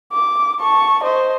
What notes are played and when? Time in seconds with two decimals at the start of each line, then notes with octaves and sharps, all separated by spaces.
0.13 D6
0.61 A5 C#6
1.04 C5 D#5